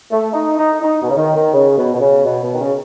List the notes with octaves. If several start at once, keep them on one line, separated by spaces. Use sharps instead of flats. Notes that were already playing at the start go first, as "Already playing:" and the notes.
A3
D#4
D#4
D#4
B2
C#3
D#3
D#3
C#3
B2
B2
C#3
B2
B2
D#3
C#3